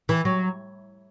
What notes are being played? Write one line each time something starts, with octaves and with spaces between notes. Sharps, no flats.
E3
F#3